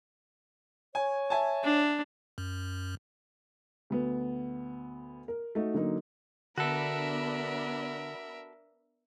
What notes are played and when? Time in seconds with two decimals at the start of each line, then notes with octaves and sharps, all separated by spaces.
0.95 C#5 G#5
1.30 E5 G#5 A5
1.64 D4
2.38 F#2
3.90 D2 B3
5.28 A#4
5.55 A3 D#4 F#4
5.74 D3 F#3 A#3 D#4
6.58 D3 B3 D4 F#4 A4 A#4 E5 B5